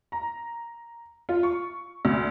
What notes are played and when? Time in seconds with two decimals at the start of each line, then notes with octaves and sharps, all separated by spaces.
0.12 A#5
1.29 F4
1.43 C#6
2.05 D2